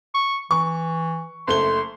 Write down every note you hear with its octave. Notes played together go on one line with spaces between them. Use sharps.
C#6
E3 C#6
F#1 A3 C6 G7